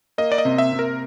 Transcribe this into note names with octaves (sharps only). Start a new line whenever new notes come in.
A#3 D#5
D5
D#5
C3
E5
C3
A#4